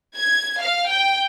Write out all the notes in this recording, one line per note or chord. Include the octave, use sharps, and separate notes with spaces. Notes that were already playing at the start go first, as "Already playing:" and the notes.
G#6
F5
G5